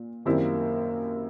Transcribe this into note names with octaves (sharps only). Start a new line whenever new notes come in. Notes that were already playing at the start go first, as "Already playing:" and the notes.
Already playing: A#2
F#2 D#3 G3 A#3 C4 E4